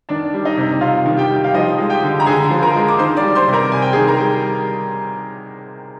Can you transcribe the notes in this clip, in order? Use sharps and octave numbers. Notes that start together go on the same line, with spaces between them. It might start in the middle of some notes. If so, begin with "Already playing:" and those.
D#3 D4 D5
G3
D#4 D#5
C3
C3 F4 F5
D#3
G4 G5
G3
F5
F3 D#4 D#5
G#3
G4 G5
D3
A#5
D3 G#4 G#5
F3
A#4 A#5
G#3
D6
D#3 C5 C6
D5 D6
G3
C5 C6
C3
A#4 A#5
C3 G#5
G5
G#4 G#5
D#3
A#4 A#5
G3